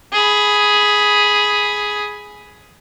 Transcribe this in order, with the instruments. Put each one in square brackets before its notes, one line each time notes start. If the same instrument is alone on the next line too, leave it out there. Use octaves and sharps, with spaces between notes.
[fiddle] G#4 B5